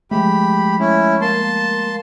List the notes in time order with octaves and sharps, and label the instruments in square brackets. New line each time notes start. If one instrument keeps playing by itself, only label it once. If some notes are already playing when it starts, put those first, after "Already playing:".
[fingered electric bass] F3 G#3 A3 [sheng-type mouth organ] G4 B5
[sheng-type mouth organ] C#4 E4
[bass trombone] A#3 [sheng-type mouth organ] A5 C6